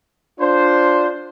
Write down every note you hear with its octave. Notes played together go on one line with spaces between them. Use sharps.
D4 F4 C5